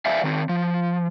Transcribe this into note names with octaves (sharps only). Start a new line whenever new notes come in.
C5 D5 E5 F5 G#5
D#3 C4
F3